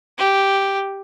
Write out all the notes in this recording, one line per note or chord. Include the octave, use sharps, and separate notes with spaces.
G4